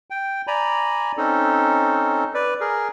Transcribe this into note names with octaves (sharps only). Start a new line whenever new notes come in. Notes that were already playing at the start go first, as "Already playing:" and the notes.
G5
D5 G#5 A#5 B5
C4 C#4 D#4 A4
B4 D5
G#4 A#4